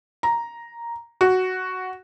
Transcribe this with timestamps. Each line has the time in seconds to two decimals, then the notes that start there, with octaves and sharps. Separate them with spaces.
0.23 A#5
1.21 F#4